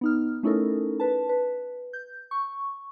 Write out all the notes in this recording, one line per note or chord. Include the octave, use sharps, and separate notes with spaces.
B3 D#4 F6
A3 C#4 D#4 E4 A4 A#4
B4 A5
B4
G6
C#6